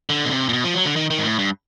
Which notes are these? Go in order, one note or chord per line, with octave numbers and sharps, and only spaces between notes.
D3
B2
C3
A#2
B2
F3
F#3
D3
D#3
D#3
G#2
A2
G2